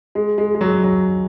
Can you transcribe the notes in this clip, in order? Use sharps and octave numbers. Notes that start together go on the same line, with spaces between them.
G#3
G#3
G#3
F#3
F#3